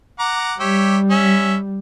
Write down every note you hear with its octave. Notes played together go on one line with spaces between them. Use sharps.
F#5 A#5 D6
G3 G4 C#5 E5
C#4 E5